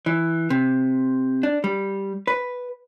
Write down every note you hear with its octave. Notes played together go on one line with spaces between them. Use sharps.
E3
C3
D4
G3
B4